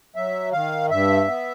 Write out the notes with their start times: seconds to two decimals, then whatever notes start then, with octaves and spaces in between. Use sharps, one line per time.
0.16 F#3 E5
0.52 D#3 F5
0.90 G2 E5
1.27 B3